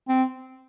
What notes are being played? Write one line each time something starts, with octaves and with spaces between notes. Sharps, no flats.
C4